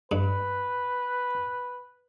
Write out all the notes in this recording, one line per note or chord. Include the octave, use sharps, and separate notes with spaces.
G2 B4